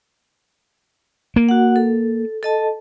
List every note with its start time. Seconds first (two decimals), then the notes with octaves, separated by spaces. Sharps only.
1.36 A#3
1.49 F#4 F#5
1.76 A4
2.43 A4 D#5 A5